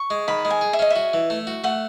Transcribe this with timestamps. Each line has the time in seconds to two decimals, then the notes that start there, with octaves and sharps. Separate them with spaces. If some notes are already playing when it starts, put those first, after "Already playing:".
Already playing: C#6
0.10 G#3
0.28 D#3 B5
0.45 G#3
0.50 G#5
0.61 G#4
0.73 E5
0.79 C#4 D#5
0.90 E5
0.96 F#4
1.13 E3
1.30 A3
1.47 F#4
1.64 A3 F#5